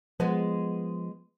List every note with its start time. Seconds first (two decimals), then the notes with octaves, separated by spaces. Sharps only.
0.20 F3 G#3 B3